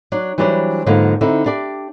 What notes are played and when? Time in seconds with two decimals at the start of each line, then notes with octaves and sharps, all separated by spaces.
0.12 F#3 D4
0.38 E3 F#3 G3 D4 B4 C5
0.86 G#2 D3 F3 G#3 A#3 B3
1.21 D3 C4 D#4 E4
1.46 D4 G4 D5